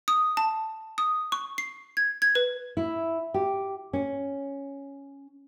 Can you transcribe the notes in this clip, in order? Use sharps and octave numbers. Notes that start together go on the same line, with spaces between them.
D#6
A5
D#6
C#6
C7
G#6
G#6
B4
E4
G4
C#4